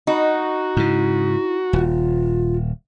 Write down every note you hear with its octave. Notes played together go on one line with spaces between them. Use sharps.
D#4 F#4
G#2 C#3 E4
D#1 F4